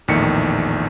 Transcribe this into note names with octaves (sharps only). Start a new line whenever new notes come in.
A#1 E2 A2 D#3 B6 C#7